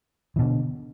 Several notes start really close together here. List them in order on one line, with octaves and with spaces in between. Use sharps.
E3 B2 D3